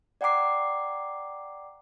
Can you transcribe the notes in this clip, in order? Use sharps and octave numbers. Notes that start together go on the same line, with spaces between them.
D5 F#5 G5 A#5 D6 C7